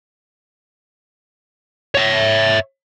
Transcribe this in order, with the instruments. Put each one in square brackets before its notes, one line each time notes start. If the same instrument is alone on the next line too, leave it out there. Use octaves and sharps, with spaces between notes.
[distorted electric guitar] C#5 E5